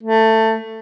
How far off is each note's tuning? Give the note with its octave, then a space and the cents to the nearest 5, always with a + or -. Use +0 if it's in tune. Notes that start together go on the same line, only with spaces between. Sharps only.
A3 +15